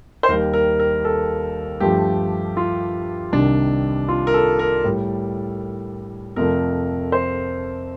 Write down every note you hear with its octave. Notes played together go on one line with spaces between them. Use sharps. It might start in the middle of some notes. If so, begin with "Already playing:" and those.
C5
D#2 D#3 G3 A#4
A#4
A#4
A4
G2 F3 A3 G4
F4
C2 C3 D#3 G3 D4
F4
A#4
A4
A#4
A2 G3
F2 C3 F3 A3 A#4
C5